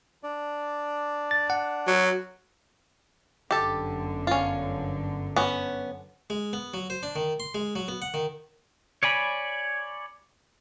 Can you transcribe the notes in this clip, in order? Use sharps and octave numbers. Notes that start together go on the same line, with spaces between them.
D4 D5
A6
F#5
F#3
G1 F#2 D3 G4 A4
C#4 F4
B3 C#4
G#3
B3
F#3
C5
D4
D#3
C6
G#3
F#3
B3
F#5
D#3
C#5 D5 G#5 B5